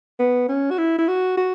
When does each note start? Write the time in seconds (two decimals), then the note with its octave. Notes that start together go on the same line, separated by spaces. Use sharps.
0.20 B3
0.49 C#4
0.71 F#4
0.78 E4
0.99 E4
1.08 F#4
1.37 F#4